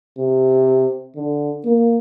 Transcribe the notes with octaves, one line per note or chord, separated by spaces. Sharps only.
C3
D3
A#3